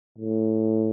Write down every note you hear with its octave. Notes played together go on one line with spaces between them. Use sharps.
A2